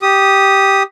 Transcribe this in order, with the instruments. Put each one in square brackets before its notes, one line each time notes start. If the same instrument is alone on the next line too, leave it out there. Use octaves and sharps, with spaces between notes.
[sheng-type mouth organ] G4 D#6